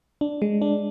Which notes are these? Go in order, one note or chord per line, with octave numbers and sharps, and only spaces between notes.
D4
G#3
D4